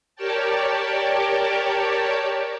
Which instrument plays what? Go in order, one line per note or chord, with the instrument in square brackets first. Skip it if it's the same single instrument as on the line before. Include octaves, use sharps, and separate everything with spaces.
[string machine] G4 A#4 C#5 D5 G5 A5